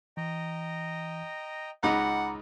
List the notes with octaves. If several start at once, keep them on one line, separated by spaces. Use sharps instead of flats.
E3 D#5 G5 A#5
C#2 D#4 F#5 A#5 B5 D6